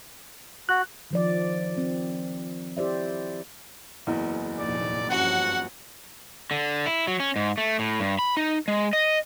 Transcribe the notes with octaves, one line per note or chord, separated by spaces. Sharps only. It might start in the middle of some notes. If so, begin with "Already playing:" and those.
F#4 F#6
D#3 F3 D5
C4
E4 G4 C5 D5 E5
F#1 E2
F1 A#1 D#2 D5
G2 F3 C#4 F#4 F#5
D3
E4
F#3
C#4
G#2
A3
A2
G2
B5
D#4
G#3
D#5